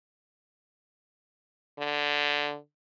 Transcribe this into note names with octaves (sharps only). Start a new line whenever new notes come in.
D3